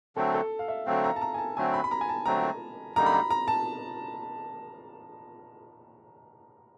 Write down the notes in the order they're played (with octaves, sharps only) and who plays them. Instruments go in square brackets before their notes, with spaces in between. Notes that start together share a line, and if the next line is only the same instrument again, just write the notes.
[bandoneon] D3 F#3 A3 C4 [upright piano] A4
[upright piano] A4
F5
E5
[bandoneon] D3 F#3 A3 C4 [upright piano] F5
[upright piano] A#5
A5
A#5
G#5
A5
[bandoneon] D3 F#3 A3 C4 [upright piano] G#5
[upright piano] B5
B5
A#5
G#5
A5
[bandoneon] D3 F#3 A3 C4 [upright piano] A#5
[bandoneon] F#2 D3 G3 A#3 D#4 [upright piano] A#5
[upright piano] B5
A#5
A#5
A5